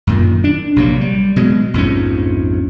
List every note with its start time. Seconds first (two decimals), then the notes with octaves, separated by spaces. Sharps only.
0.07 F#2 A#2 D#3
0.44 D4
0.76 A#1 C3 F#3 A#3
1.01 G3
1.36 B2 F#3 G#3
1.74 A#1 F2 G#2 C#4